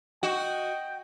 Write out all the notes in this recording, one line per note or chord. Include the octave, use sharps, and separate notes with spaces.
F#4 D#5 G5